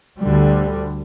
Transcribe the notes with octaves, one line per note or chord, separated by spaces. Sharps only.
D2 D3 G3